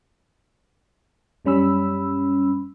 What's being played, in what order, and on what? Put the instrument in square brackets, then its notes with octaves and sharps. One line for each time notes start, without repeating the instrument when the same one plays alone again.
[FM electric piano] F#2 G3 C#4 B5 E6